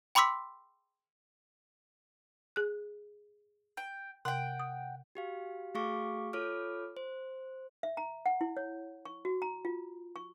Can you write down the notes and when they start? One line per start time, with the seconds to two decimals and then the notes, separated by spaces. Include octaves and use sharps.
0.15 G5 B5 C6 D6 E6 B6
2.56 G#4 F#6
3.77 G5
4.25 C3 F#5 G5
4.60 D#6
5.15 F#4 G4 F5
5.75 A3 F#4 G#4 F5 C#6 D6
6.33 F4 A4 C#5 D6 F6
6.97 C5
7.83 E5
7.97 A#5
8.26 F#5
8.41 E4
8.57 C#5
9.05 C#6
9.25 F#4
9.42 A#5
9.65 F4
10.16 C#6